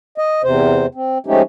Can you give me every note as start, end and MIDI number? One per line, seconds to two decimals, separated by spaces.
0.18 0.42 75
0.44 0.86 40
0.44 0.86 48
0.44 0.86 72
0.95 1.18 60
1.27 1.42 53
1.27 1.42 56
1.27 1.42 57
1.27 1.42 61
1.27 1.42 63
1.27 1.42 67